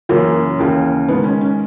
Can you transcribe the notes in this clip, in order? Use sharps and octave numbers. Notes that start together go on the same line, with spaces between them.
F#2 C#3 E3 A#3
D#2 C#3 E3
G#2 D#3 B3
C#4
C#4